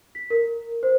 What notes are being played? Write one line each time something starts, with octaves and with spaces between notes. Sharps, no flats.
B6
A#4
C5